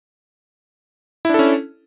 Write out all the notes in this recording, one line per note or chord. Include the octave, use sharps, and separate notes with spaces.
C#4 D4 E4 A4